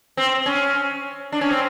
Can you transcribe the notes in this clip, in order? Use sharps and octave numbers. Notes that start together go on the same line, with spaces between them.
C4
C#4
D4
C#4
C4